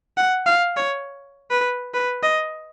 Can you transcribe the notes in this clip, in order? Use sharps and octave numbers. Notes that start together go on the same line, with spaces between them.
F#5
F5
C#5
B4
B4
D#5